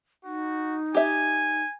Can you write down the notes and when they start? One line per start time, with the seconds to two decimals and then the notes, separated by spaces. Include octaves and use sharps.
0.24 D#4 F#4
0.94 G4 E5 G#5